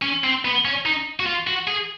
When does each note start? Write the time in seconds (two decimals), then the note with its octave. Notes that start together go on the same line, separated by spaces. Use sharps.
0.02 C#4
0.24 C4
0.45 B3
0.65 C#4
0.86 D#4
1.20 F#4
1.26 F4
1.47 F#4
1.67 G#4